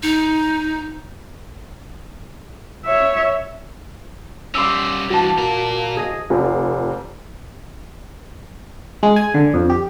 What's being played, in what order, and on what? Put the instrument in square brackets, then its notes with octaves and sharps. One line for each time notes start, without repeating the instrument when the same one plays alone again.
[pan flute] D#4
[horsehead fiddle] C#5 E5
[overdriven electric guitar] G3 C#4 [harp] C6 D6 E6
[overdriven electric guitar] G2 E3 [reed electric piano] F#4 A5
[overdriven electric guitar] A#2 A#4
[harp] G#4 D#5
[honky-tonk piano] F1
[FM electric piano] G#3
G#5
D3
F2
G4